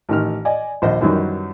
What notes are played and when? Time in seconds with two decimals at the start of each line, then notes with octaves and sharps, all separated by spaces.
0.09 A1 D#3 F6
0.45 D5 D#5 G#5
0.82 A#1 D#2 C5 D#5
1.01 F#2 D#3 E3 F#3 G3